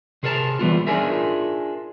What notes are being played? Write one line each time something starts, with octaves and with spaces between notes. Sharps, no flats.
C3 G#4 A#4 C5 A5 A#5
E3 G3 B3 F4
D4 D#4 F4 G#4 A#4 E5